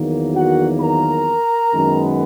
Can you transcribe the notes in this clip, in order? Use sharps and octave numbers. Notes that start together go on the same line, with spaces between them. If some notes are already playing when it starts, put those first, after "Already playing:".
Already playing: E2 D#3 F#3 A#3
F#4 F#5
A#4 A#5
F#2 D#3 G#3 B3